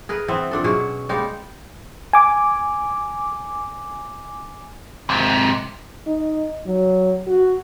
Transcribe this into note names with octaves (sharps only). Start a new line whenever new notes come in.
G#4 A#4 B4
E3 B3 C4 E5
A#2 D4 A4
B2 F#3 C#4 G#4
G3 G#3 A#3 D#4
G#5 D6
G#2 C3
D#4
F#3
F#4